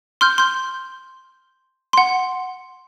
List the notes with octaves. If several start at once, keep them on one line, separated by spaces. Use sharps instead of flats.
C6 F6 G6
C6 G6
F#5 C6